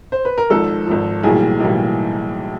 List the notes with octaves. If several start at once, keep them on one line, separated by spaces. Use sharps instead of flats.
C5
B4
A#4
G#1 G#2 F3 A4
G#1 G#2 F3
B1 A2 E3 G3 A#3 G#4
B1 A2 E3 G3 A#3